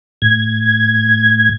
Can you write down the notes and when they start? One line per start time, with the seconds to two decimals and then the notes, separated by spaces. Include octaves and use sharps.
0.22 A2 G#6